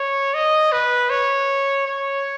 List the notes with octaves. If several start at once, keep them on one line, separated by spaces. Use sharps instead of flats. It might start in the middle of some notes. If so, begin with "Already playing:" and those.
Already playing: C#5
D#5
B4
C#5
C#5